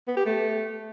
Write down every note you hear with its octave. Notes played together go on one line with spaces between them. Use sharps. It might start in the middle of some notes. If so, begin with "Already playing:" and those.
B3
G4
A3